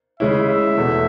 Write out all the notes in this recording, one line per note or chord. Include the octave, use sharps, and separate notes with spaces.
C#3 G#3 C#4 E4 E5
E5
E2 B2 A3